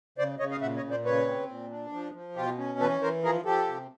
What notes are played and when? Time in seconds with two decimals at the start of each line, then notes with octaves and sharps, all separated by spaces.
0.18 C#3 C5 D5
0.39 C#3 C#5 D#5
0.51 D#5 F5
0.61 A#2 E5 F#5
0.77 C#5 D#5
0.83 A#2
0.91 C5 D5
1.05 C#3 B4 C#5
1.28 C4
1.49 A#2
1.71 D4
1.93 F3
2.14 F3
2.36 B2 F4 G4
2.58 C#4
2.79 E3 A4 B4
3.01 E3 A#4 C5
3.23 F3 G#4 A#4
3.45 F3 G4 A4
3.67 C3